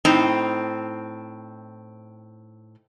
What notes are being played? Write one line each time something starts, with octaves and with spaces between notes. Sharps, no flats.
A2 C4 D#4